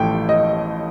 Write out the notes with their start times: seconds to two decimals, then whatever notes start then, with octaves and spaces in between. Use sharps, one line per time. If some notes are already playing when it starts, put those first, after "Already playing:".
Already playing: A1 A2 F3 A3 G5
0.29 D#5